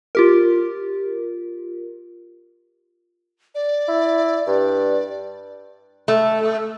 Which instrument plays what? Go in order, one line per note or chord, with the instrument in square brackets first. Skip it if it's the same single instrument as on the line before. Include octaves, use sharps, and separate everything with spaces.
[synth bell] F4 G4 A#4
[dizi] D5
[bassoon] E4
[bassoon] G2 [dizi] D5
[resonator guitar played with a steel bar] A3